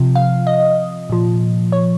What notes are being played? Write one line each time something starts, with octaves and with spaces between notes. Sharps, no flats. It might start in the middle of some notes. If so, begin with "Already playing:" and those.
Already playing: C3 F3
F5
D#5
A#2 F3
C#5